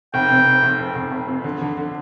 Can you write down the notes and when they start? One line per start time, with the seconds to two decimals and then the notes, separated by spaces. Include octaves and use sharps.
0.14 F1 G5
0.31 C3
0.46 C3
0.63 F1
0.79 F2
0.95 F1
1.12 F1
1.28 F2
1.44 D3
1.62 D3
1.77 D3